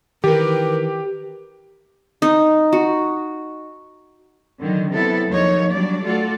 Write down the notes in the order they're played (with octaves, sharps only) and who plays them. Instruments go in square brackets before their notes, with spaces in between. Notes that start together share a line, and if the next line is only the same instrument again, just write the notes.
[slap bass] D#3 E3 [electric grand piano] G4 [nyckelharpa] A#4 B4
[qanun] D#4
F#4
[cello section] D3 D#3 F#3
C3 F#3 B3 E4 A4
D#2 F3 A#3 D#4 C#5
F#3 G3 D4 D5
A3 F4 F#4 A4 D5